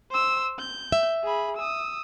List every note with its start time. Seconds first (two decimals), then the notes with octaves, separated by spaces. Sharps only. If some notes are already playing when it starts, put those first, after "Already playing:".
0.11 C5 E6
0.59 G6
0.92 E5
1.24 G#4 B5
1.57 D#6 E6